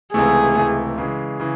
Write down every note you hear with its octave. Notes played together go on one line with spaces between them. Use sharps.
C#2 C3 E3 A3 G#4
C#2 C3 E3 A3
C#3 E3 G#3
C#3 E3